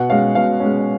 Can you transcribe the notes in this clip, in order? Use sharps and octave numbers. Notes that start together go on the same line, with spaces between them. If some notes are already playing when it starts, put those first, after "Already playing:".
Already playing: B2 F#5
G#3 C#4 F5
B2 F5
G#3 C#4